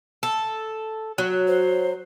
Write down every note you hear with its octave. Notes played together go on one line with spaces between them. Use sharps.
A4
F#3
C5